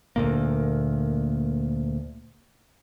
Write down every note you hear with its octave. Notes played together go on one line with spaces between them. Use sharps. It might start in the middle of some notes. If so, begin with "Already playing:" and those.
D2 A#2 A#3